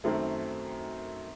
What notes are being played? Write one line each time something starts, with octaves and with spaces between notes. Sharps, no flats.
F#2 D#3 F#3 A3 C4